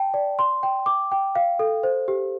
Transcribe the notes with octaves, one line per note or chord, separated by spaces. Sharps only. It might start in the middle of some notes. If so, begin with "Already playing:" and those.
Already playing: G5 A5
D5
C6
G5
D6
G5
F5
A4
C5
G4